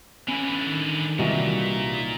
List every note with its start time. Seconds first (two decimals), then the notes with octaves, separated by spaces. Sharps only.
0.28 D3 E3 C#4
0.68 D#3
1.19 C2 A#2 E3 G3 D#4 F#4